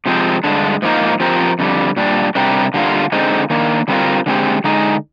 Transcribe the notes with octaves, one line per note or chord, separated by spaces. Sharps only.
C3 F3 G#3 C4
G2 D3 G#3 D4
G#2 F3 A#3 D#4 A#4
F3 C4 G4 A#4
F2 D3 G3
A#2 G3 D4
C3 G3 D4 G4 A#4
D3 G3 A#3 F4
D3 G#3 C4 D#4
D#3 A#3 D4
D3 G3 C4 F4 A#4
D3 G#3 C4 G4
D3 G#3 D#4